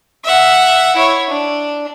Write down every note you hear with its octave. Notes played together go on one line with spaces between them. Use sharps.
E5 F#5
E4 C#5
D4